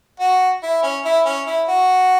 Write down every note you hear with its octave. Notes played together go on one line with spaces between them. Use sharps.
F#4
E4
C#4
E4
C#4
E4
F#4